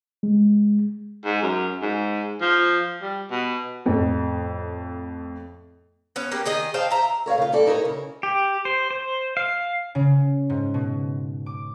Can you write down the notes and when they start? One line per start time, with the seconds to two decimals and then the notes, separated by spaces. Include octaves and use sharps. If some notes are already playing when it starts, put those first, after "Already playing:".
0.23 G#3
1.24 G#2
1.42 F#2
1.82 G#2
2.41 F3
3.02 G3
3.31 B2
3.86 F2 A2
6.16 B3 C#4
6.32 A#3 G4
6.45 D#3 G#4 D#5
6.74 C5 F5 G5 A5
6.91 E5 A#5
7.26 A#4 C#5 D5 F5
7.38 C#3 F4
7.52 G3 C4 F4 A4 D5
7.66 D#4 E4 A4 A#4 C#5
7.85 C#3
8.23 G4
8.65 C5
8.90 C5
9.37 F5
9.95 C#3
10.50 G#2
10.74 B2
11.46 D6